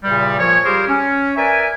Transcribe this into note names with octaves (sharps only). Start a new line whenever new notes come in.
E2 A#2 C#3 G3
A#2 F3 C#5
F3 G3 G4 G#4 A#4 C5
C#4
A#4 B4 D5 E5 G#5